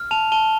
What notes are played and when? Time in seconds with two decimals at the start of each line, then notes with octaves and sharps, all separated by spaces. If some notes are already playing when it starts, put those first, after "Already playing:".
Already playing: F6
0.11 A5 F7
0.32 A5 G7